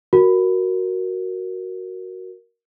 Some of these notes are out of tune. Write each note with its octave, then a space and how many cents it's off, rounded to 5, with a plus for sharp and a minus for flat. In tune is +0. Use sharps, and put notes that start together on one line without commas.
F#4 +0 A#4 +0